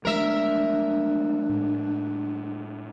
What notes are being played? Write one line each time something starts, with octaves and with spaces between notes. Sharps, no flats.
F3 G#3 A3 D4 A#4 E5
A2 G#3